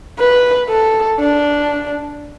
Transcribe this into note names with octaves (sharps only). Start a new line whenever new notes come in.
B4
A4
D4